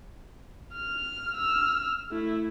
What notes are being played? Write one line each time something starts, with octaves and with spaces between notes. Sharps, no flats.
F6
E6 F6
A3 E4